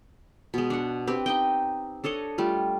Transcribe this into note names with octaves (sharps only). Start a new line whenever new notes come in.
B2 G#3
D4 F#5
C4 G4 B4
D#4 D#5 G5
D4 A4 C#5 D#5
G3 A3 F4